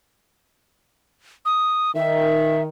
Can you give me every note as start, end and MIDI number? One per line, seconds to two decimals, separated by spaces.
1.45 1.91 87
1.95 2.66 51
1.95 2.62 76